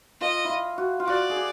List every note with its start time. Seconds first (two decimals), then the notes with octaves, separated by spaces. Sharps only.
0.21 F4 D#5
0.45 E4 F4
0.78 F#4
1.00 F4
1.06 F#4 D5
1.30 G#4
1.36 G4